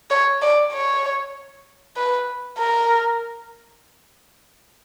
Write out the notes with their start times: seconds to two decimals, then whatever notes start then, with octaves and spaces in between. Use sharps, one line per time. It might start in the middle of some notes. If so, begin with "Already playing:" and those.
0.10 C#5
0.42 D5
0.72 C#5
1.97 B4
2.58 A#4